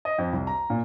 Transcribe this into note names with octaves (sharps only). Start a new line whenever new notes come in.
D#5
F2
C2
A#5
A#2